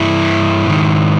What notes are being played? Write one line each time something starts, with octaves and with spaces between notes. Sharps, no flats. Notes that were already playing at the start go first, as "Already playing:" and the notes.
Already playing: G2 E3 E4
G#2 D#3